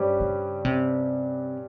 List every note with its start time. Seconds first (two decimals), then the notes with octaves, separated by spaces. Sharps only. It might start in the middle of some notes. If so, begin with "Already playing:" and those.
Already playing: G2 G3 C#4 G4 C5
0.20 C#3
0.65 C3